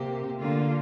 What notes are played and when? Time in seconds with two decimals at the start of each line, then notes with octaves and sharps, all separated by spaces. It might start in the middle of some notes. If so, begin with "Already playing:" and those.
Already playing: C3 A#3 G4
0.39 D3 A#3 F4